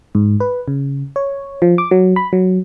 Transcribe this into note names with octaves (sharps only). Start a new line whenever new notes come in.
G#2
B4
C#3
C#5
F3
D6
F#3
B5
F#3